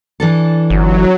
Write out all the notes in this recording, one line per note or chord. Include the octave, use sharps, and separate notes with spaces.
E3 D4 A4
G1 F#3